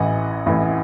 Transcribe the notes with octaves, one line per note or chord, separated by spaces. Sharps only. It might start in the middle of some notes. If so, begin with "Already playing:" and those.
Already playing: A1 A2 E3 D#5 F#5
A1 A2 E3